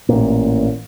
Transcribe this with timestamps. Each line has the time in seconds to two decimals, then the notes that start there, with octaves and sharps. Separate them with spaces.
0.09 A1 A#2